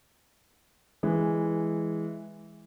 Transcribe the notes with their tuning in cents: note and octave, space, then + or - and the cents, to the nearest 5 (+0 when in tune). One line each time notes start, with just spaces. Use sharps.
E3 +0 G#3 +0